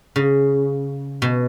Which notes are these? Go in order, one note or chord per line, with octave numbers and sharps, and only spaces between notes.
C#3
B2